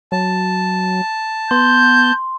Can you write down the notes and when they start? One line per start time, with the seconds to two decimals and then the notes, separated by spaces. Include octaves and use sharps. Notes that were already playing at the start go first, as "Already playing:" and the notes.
0.12 F#3 A5
1.51 B3 C6 G6